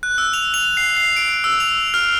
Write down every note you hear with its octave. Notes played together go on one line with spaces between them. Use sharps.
F#6
E6
F7
F7
C7
C7
D7
E6
F7
F6